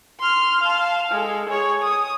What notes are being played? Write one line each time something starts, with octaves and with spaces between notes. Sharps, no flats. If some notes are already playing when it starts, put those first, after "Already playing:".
C6 F6
F5 A5
G#3 A4
G#4 C#5
D#6